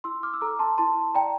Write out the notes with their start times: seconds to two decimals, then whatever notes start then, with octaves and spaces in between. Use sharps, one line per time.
0.04 E4 C6 E6
0.23 D6 F6
0.34 E6
0.41 A4 A#5 D6
0.59 A5 C6
0.78 E4 A5 C6
1.15 D5 G5 A#5